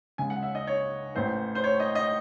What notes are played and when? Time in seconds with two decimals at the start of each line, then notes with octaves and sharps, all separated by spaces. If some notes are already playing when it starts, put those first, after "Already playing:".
0.18 C#2 C#3 G#3 G#5
0.30 F#5
0.42 E5
0.55 D#5
0.67 C#5
1.15 A1 A2 E3 C5
1.55 C5
1.64 C#5
1.80 D#5
1.95 D#5